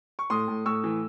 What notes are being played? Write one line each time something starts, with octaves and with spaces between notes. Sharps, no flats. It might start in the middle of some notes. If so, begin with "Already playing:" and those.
C#6
A2 C6 D#6
A2
A2 C#6 E6
E3